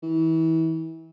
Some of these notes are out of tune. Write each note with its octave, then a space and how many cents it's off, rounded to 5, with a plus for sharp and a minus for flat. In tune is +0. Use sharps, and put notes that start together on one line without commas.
E3 -30